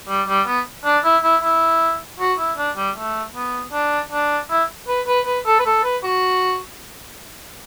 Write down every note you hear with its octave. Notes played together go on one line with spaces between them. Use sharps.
G3
G3
B3
D4
E4
E4
E4
F#4
E4
D4
G3
A3
B3
D4
D4
E4
B4
B4
B4
A4
B4
A4
B4
F#4